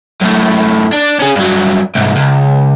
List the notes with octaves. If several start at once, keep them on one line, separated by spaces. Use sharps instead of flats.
F#2 A2
D4
C#4 G#4
G2 F#3
C2 G#2
C#2